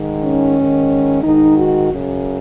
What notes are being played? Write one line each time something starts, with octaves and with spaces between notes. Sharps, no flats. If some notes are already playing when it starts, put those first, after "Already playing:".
Already playing: G#2 D#3
C#4
G#2 D#3
G#2 D#3 D#4
F#4
F#2 C#3